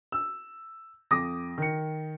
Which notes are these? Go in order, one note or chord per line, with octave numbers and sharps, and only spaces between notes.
E6
F2 D6 D#6 A#6
D#3 C#7